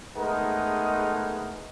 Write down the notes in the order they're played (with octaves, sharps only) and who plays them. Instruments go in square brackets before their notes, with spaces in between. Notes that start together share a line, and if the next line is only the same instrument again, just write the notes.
[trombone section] G#3 A3 B3 D#4 G#4 A#4